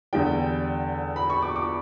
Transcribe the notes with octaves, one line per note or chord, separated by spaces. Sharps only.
E2 D3 G3 G5
B5
C#6
D6
D6